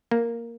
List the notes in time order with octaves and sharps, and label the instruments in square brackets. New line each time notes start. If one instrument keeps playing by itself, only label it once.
[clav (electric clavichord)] A#3